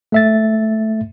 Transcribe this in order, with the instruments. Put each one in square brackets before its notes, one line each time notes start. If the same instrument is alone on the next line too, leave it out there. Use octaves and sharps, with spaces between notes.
[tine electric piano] A3 E5 A6